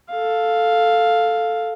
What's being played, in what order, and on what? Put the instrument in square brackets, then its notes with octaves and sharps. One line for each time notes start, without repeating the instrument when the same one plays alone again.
[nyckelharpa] A4 F5